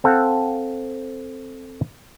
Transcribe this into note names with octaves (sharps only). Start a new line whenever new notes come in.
C4 A4 F5 F#5